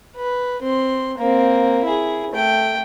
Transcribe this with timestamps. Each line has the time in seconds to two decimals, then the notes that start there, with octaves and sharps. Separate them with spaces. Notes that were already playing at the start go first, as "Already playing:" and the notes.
0.16 B4
0.62 C4 C6
1.18 A#3 C4
1.84 E4 G#4
2.32 A3 G5